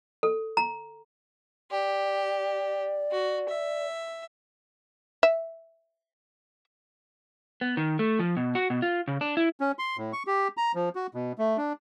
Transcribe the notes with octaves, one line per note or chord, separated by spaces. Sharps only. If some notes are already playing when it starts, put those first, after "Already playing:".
A4
A#5
G4 D5
F#4
E5
E5
B3
D#3
A3
F3
B2
F#4
B2
F4
C#3
D4
E4
C#4
C6
A2
C#6
G4
A#5
F3
F#4
B2
A3
D4